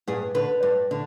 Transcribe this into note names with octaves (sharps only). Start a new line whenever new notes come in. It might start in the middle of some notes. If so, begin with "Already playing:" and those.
G2 G#4
D3 B4
G2
D3